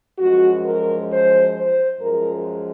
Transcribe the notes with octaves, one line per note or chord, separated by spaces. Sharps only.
F#2 F3 G#3 F#4
A#4
C5
C5
F#2 F3 G#3 A#4